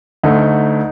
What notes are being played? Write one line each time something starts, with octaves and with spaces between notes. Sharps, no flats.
D2 D3 A3 D#4